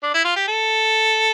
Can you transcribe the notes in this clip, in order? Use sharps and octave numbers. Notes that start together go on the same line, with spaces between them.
D4
E4
F4
G4
A4